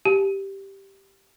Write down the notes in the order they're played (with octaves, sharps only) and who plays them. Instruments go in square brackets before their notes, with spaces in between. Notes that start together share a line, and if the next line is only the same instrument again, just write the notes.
[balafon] G4